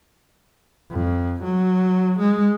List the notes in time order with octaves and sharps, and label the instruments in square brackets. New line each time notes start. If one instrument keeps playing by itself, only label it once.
[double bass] F2
F#3
G#3